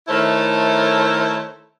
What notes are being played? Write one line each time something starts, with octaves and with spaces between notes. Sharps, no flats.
D#3 A3 E4 A4 C5 C#5